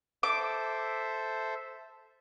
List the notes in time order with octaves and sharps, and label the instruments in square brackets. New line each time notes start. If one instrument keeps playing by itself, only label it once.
[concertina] A4 C5 E5 [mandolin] D6